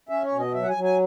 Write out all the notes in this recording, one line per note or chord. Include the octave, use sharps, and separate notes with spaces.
C#4 E5
C#5
B2
D#5
F#3 E5
F#5
G#5
F#3
G#5